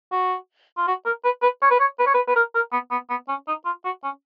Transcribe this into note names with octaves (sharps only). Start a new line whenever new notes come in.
F#4
F4
F#4
A#4
B4
B4
C#5
B4
C#5
B4
C#5
B4
B4
A#4
A#4
B3
B3
B3
C#4
D#4
F4
F#4
C#4